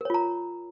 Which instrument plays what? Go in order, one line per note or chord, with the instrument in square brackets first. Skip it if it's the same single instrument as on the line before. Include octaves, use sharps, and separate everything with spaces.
[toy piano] A#4
C#5
F4
A#5